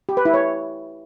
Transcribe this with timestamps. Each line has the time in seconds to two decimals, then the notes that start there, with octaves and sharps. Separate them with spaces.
0.09 G4
0.17 B4
0.25 E4
0.34 C#5